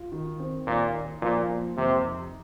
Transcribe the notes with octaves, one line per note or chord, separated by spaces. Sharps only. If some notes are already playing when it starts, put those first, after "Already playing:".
Already playing: F4
D#3
C4
D#2 A#2
D#4
A#2 F3
A#3
F2 C3
D#4